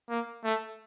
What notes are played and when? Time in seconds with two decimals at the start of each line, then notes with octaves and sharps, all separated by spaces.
0.09 A#3
0.44 A3